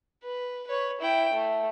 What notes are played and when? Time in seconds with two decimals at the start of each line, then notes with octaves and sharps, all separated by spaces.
0.24 B4
0.67 B4 C#5
1.00 E4 G5
1.33 A3